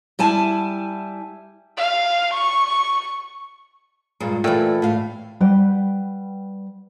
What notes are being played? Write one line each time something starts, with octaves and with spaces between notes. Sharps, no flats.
G3 E4 G#5 A5
F5
C#6
G2 A#2 G#3
A#2 E3 A3 A4 D5 G5
A2 F5
G3 B4 F#5 G5